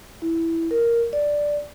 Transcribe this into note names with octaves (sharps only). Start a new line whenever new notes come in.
E4
A#4
D5